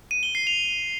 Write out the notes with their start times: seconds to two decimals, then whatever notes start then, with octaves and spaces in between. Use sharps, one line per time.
0.11 D#7
0.23 G7
0.35 C7
0.47 F7